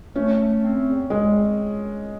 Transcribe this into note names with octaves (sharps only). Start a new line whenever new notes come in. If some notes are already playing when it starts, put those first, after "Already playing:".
A3 C#4
A3
C4
E2
E2 G#3
C4